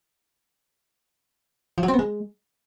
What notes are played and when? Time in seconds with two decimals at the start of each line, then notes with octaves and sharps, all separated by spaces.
1.78 F3
1.83 F#3
1.88 C4
1.94 B3
1.99 G#3